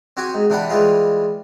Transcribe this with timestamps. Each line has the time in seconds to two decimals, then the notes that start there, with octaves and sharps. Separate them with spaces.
0.17 C4 F#4 G4 G#5
0.34 G#2
0.50 C3 E3 D4 F#5 G5 B5
0.70 E3 G3 G#3 F4